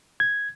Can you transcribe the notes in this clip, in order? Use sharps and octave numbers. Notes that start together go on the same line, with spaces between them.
G#6